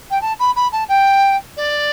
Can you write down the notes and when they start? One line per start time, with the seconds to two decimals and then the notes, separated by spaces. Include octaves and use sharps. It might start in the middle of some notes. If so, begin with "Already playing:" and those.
0.10 G5
0.21 A5
0.39 B5
0.56 B5
0.72 A5
0.88 G5
1.57 D5